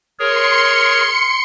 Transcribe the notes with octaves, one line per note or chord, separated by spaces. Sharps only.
G#4 A#4 C#5 C6 C#7